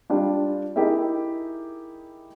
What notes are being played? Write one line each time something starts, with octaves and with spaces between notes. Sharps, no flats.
G3 D4 F4
D#4 E4 G4 G#4 A#4 E5